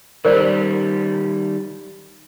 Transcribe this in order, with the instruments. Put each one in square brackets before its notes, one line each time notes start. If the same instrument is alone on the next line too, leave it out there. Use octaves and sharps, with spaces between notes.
[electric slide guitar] D#3 G3 [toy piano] A#4 C5 D5